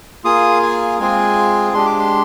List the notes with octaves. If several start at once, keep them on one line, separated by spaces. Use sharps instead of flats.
A#3 F4 G#4 D#6
G#5
G#3 C4 F4 G#4 G#5
G#3 D4 G4 C6
D6
C6